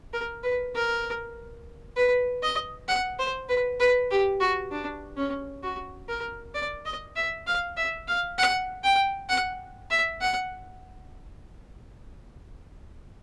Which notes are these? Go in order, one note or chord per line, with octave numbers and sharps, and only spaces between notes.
A#4
B4
A#4
B4
D#5
F#5
C5
B4
B4
G4
F#4
D4
C#4
F#4
A#4
D5
D#5
E5
F5
E5
F5
F#5
G5
F#5
E5
F#5